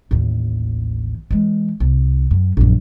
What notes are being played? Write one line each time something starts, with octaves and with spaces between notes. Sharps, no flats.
A1 D#2
E3 G#3
C2
F#2
A#1 F#2